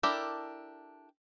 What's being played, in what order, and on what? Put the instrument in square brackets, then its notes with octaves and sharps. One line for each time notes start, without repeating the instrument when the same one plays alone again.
[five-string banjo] D4 E4 G4 A4 A#4